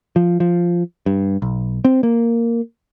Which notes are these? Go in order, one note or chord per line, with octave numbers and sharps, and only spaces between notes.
F3
F3
G2
B1
C4
A#3